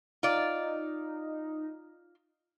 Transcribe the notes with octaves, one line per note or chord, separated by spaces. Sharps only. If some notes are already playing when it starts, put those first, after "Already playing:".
D#4 F4 D5